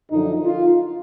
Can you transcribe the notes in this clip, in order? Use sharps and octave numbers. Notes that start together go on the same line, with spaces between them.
F#2 D3 F3 D#4
F4